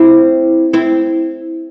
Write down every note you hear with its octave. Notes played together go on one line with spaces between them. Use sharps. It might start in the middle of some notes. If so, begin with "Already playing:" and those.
Already playing: C4 E4
C4 E4